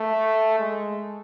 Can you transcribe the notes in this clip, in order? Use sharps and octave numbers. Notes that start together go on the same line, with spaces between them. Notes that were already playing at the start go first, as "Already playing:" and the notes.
Already playing: A3
G#3